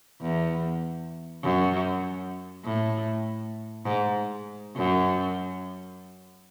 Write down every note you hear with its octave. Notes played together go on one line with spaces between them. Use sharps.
E2
F#2
A2
G#2
F#2